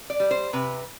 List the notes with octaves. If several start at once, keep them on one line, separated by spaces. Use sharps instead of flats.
D5
G3
C5
C3 B4